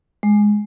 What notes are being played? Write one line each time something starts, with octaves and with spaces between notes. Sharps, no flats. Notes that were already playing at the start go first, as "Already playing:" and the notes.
G#3